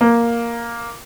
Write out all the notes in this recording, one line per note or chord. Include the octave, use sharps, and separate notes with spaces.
A#3